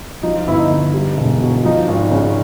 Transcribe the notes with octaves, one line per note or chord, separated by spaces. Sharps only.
F3 D#4
F4
G1 E4
D#4
D3
G3
E1
B2
F3 D#4
G#1
C#3